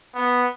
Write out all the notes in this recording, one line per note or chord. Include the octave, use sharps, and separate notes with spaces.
B3